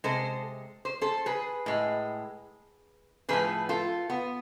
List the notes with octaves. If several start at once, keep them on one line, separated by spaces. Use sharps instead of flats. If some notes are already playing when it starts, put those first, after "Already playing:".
C3 G#3 A4 C5
C5
A4 C5
G#4 B4
A2 G#3
A2 F3 A3 G#4 B4
F4 A4
B3